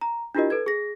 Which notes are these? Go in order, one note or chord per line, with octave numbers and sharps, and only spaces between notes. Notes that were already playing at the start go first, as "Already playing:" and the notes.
A#5
D4 E4 F4 G4 A#4 D#5
A4 B4 G#6
G#4 A#6